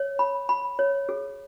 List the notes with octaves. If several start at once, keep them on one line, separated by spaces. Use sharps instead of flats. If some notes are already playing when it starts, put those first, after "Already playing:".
Already playing: C#5
B5
B5
C#5
G#4